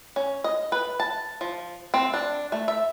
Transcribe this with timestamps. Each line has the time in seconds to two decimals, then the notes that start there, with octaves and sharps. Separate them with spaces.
0.16 C#4
0.44 D#5
0.72 B4
1.00 A5
1.41 F3
1.94 C4
2.14 D4
2.52 A3
2.68 E5